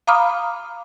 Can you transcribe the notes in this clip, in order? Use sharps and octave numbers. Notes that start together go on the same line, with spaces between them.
F5 A#5 B5 D6 D#6 F6